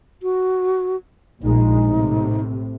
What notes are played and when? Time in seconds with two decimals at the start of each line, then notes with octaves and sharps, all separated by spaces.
0.23 F#4
1.43 A#1 G#3 D#4
1.83 A2 C3